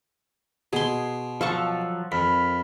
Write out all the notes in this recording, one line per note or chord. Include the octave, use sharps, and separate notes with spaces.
B2 G#4 C6
F3 F#3 A4 F5 A5 C#6
F2 A#4 B5